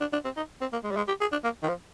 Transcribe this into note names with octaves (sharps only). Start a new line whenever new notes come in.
D4
D4
C4
D#4
C4
A#3
G#3
G3
G#3
G4
G#4
D4
A#3
D#3
F3